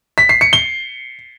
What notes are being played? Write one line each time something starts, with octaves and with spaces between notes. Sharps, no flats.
B6
C7
C#7
G7